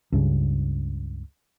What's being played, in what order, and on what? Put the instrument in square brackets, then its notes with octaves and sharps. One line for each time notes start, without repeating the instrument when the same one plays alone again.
[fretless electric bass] C#2 G2 C#3